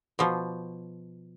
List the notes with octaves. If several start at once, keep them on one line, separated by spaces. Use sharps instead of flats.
B2 F3